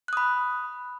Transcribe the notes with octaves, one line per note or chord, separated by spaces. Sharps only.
B5 D#6 F#6